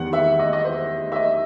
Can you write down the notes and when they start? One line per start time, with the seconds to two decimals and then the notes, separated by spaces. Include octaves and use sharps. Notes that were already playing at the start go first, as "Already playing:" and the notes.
Already playing: E2 D#3 G3 B3 F#5
0.13 E5
0.39 D#5
0.53 D#5
0.64 C5
1.12 E5
1.16 D#5